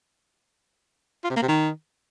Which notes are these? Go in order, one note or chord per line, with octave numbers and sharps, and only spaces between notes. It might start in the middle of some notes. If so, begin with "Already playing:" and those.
F4
C3
A#3
C3
D#3